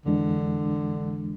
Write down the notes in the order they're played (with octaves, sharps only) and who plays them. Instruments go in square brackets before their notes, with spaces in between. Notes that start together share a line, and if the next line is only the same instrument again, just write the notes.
[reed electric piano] F2 E3 G#3 D4 [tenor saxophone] D3